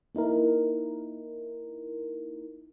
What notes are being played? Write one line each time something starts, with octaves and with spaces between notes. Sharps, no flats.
A#3 D#4 E4 A#4